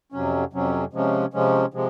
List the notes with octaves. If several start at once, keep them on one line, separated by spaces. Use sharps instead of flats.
F2 C3 F#3 C#4
F2 C3 F#3 C#4
C3 F3 G#3 C#4
C3 F3 G#3 C#4
C3 F3 G#3